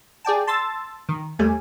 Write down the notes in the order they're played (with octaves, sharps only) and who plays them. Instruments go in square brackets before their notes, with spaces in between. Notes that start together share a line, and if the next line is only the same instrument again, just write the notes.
[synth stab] G#4 D5 G5 A5
A5 C6 E6 A6
D#3
D#2 G3 A3 G#5